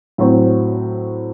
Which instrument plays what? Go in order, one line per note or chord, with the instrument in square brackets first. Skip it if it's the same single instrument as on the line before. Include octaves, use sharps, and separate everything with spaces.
[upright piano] A2 F#3 C4